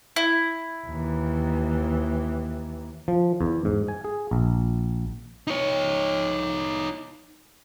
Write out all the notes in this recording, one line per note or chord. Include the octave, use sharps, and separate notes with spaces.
E4
D#2 E3
F3
E2
G#2
G#5
G#4
A#1
D#4 C#5